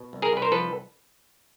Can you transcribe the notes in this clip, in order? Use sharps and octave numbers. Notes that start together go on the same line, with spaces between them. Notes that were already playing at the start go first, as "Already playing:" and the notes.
Already playing: B2
C2
G#4 A#4
C2 B4
A#4 C5
F3 A4 B4